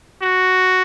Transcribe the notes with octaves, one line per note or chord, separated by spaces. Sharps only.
F#4